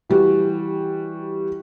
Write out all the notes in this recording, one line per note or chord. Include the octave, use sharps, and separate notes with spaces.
E3 G3 F#4